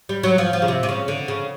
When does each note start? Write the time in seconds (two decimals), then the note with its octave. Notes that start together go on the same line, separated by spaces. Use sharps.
0.09 G3
0.23 F#3
0.38 F3
0.53 F3
0.62 C#3
0.68 C3
0.83 C3
0.89 C#3
1.08 D3
1.28 C#3